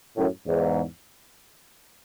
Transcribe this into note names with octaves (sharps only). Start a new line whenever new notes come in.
F#2 A2
E2 G#2